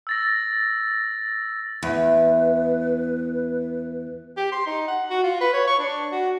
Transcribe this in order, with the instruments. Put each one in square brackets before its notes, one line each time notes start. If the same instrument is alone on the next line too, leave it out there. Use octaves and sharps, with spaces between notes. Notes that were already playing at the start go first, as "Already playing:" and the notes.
[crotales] E6 A6 A#6
[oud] E2 [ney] B4
[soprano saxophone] G4
C6
D#4
F#5
F#4
F4
B4
C#5
C#6
D4
F#4